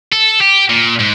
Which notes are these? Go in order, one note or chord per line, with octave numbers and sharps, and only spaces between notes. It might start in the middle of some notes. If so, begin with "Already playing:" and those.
A4
G4
A#2
G#2